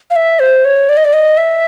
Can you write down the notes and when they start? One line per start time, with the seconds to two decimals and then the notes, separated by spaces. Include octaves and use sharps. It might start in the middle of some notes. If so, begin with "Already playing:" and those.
0.10 F5
0.16 E5
0.40 C5
0.65 C#5
0.89 D5
0.97 D#5
1.05 D5
1.13 D#5
1.37 E5